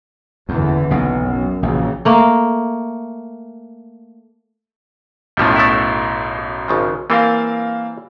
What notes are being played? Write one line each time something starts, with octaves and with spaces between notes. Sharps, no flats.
F#1 E2 D3 E3
B1 B2
F#2
A#1 C#3 E3 F#3
A3 A#3
B1 F#2 A2 D#3 F3 G3
A3 B3 E4
G#1 C#3 F3
E3 G3 A#3 C4 A#4 F5